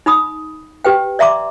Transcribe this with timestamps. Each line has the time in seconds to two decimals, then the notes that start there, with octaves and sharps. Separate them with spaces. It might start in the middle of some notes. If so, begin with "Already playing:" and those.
0.06 D#4 B5 D#6
0.85 G4 B4 G5
1.19 D5 E5 A#5 C6 D6